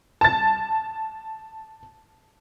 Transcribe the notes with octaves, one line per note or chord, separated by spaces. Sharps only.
A5 A6